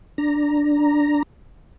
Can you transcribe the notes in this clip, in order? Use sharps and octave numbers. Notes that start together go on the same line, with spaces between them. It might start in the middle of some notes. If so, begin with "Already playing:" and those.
D4 A#5